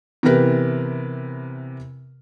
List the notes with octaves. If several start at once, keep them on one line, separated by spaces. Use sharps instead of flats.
C3 E3 B3 G4 A#4 B4